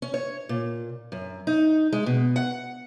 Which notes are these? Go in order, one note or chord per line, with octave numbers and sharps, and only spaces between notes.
C#4
C#5
A#2
F#2
D#4
G#3
B2
F#5